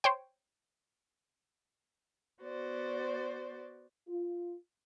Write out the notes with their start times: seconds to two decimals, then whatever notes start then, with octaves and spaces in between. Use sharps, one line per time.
0.04 C5 C#5 G5
2.41 B3 F#4 C5 D5
4.08 F4